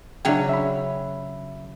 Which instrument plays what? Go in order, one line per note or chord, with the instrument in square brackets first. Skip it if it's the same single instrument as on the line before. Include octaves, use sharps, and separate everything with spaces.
[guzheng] C#3 F#3 C#4 [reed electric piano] D4 E5 G5
[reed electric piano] E5 B5